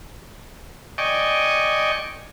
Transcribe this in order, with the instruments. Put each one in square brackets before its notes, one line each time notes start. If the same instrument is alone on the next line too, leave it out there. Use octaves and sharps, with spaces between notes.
[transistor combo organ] D5 D#5 G5 G#5 C#6